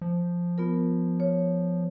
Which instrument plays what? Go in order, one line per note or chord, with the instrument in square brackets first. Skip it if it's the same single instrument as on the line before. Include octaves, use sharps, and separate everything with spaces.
[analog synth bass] F3
[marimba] B3 F4 A#4
C#5